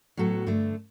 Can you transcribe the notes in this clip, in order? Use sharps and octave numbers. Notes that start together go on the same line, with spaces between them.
A2 F#3 B3 F#4 A4
G2 D3 A3